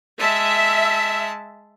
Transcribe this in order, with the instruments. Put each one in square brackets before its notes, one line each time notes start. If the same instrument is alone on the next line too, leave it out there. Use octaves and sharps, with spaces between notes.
[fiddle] G#3 A5 [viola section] E5